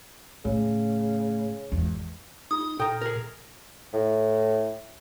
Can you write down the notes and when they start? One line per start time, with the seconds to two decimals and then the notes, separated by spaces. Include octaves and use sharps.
0.45 A2 C#3
1.72 G#1 E2
2.51 D#4 F4 D#6
2.80 A#2 A4 G5 A#5
3.01 G#4 A#4
3.93 A2